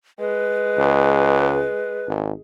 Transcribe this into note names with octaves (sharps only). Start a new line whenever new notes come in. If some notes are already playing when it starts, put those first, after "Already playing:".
G#3 B4
C#2
G#1